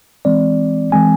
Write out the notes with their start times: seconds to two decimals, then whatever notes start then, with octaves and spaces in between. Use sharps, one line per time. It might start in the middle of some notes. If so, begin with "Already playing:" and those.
0.25 E3 G#3 C4 D5
0.92 E3 G#3 C4 G#5